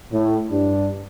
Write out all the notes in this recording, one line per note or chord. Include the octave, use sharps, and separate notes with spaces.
A2
G2 D4